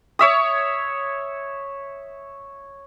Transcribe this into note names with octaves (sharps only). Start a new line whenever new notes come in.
C#5 E5 D#6